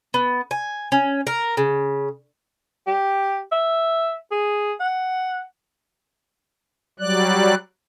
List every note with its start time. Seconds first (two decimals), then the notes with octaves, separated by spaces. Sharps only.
0.14 B3
0.51 G#5
0.92 C#4
1.27 A#4
1.57 C#3
2.87 G4
3.52 E5
4.31 G#4
4.80 F#5
7.00 F#3 G3 D5 F#6